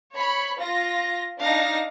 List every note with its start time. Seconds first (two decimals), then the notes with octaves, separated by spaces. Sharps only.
0.14 C#5 B5
0.58 F4 A#6
1.42 D4 D#4 F5 A#6